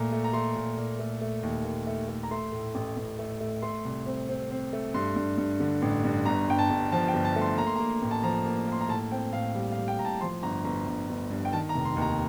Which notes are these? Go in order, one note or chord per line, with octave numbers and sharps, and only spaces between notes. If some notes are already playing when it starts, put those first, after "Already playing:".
Already playing: A#2 A3 A#5
A3
A#5
A3 C6
A#2
A#2
A3
A3
D#2
D#2
A3
A3
A#5
A3 C6
A2
A1
A1
A3
A3
A3 C6
C2
C4
C4
C4
A3
G2 C6
G2
G2
D3
A1
G2
G1 A#5
G1 G5
A5
G1
F3 A5
G5
G1
A5
A3
C6
A#3 A#5
C6
A#3 A#5
A1
A5
F3 A#5
A#3
A#3 C6
A#5
A2 A5
C4 G5
A2 F5
G3
F5
G3
G5
A2 A#5
A5
F3 C6
G1 A#5
G1 A#5
G1
G1
G2
G5
D#3 A5
A#5
F1
C6
D#2 A#5